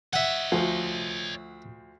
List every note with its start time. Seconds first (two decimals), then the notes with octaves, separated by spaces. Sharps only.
0.13 C#5 D#5 E5 F#5
0.52 D2 F3